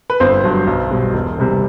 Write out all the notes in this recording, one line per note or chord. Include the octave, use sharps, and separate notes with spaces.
B4
G1 C4 C5
G2 F#3
B1
B2 G3
E1
E2 C3 G3